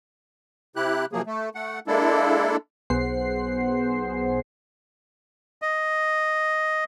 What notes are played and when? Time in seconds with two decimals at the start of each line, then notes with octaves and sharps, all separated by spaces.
0.76 C3 E4 G4 F#6
1.13 C3 F3 F#3 A#3 G#4
1.26 A3
1.55 A3 F#5
1.87 G#3 A#3 D4 E4 A4
2.90 B1 B3 G#4 C5 F#5 C7
5.62 D#5